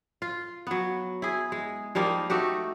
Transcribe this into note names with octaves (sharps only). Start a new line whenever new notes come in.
F4
F#3 B3
E4 G#4
G#3
F3 G3 A#3 D#4
A3 D#4 F#4 G4